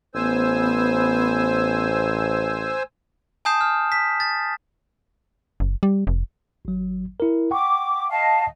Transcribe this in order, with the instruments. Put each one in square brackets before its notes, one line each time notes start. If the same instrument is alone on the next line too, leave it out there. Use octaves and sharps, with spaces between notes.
[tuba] A1 [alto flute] B3 [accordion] C5 G#5 E6
[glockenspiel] G#5 A5 D#6 G6 C7 E7
F6
B6
A6
[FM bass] F#1
G3
F1
[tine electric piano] G#1 F#3
E4 A#4
[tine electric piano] F#5 G5 C#6 [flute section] D6
[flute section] D#5 F5 A5